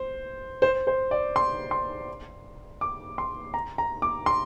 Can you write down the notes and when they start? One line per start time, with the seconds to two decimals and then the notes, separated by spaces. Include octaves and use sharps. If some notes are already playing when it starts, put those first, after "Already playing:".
Already playing: C5
0.62 C5
0.87 C5
1.11 D5
1.36 C6
1.71 C6
2.81 D6
3.18 C6
3.54 A#5
3.78 A#5
4.02 D6
4.26 C6